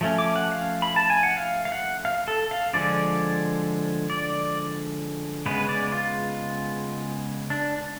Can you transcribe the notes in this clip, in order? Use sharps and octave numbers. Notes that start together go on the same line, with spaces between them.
F3 A3 C#4
D6
F#5
F5
B5
A5
G#5
F#5
F5
F5
F#5
F5
A4
F5
D3 F3 G#3 D5
D5
C#3 G#3 B3 B4
D5
F4
D4